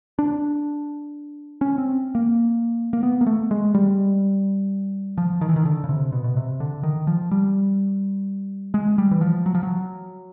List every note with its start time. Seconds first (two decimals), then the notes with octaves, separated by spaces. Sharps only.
0.19 D4
1.61 C#4
1.78 C4
2.15 A#3
2.93 A#3
3.03 B3
3.21 A#3
3.27 A3
3.51 G#3
3.74 G3
5.18 F3
5.41 D#3
5.49 E3
5.56 D#3
5.65 D3
5.84 C#3
5.89 C3
6.12 B2
6.24 B2
6.37 C3
6.60 D3
6.83 D#3
7.07 F3
7.31 G3
8.74 G#3
8.98 G3
9.11 E3
9.21 F3
9.46 F#3
9.55 F3
9.63 F#3